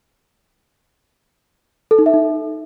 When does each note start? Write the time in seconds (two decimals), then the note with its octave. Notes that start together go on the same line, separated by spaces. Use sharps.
1.91 A4
1.99 D#4
2.06 E5
2.14 D#4